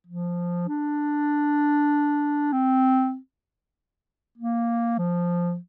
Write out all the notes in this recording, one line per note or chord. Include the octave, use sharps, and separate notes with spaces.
F3
D4
C4
A#3
F3